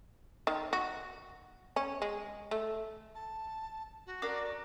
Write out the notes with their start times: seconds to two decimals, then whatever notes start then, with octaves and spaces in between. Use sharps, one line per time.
0.47 D#3
0.73 F#4
1.76 C#4
2.02 G#3
2.51 A3
3.15 A5
4.06 F#4
4.22 D4 A#4 D6